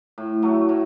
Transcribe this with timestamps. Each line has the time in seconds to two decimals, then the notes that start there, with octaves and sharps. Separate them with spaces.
0.18 A2
0.42 F#3 A3
0.69 A2